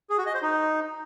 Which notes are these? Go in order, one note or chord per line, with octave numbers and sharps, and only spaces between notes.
G#4
F#4
D#5
C5
D#4